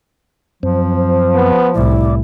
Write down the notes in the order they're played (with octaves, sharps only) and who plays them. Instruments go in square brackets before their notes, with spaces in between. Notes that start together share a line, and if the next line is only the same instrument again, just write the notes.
[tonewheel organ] F#2 C4 [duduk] F3
[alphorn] B3
[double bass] C2 A2 [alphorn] E4 [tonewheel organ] D5